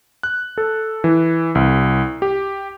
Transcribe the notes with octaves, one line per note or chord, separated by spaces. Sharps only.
F#6
A4
E3
C2
G4